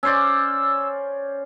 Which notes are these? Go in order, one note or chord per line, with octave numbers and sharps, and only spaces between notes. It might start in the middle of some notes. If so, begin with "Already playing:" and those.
C#4 C5 D5 E6